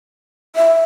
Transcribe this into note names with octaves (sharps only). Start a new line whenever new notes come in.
E5